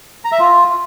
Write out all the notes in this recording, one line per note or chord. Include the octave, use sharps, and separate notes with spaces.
A#5
E5
F4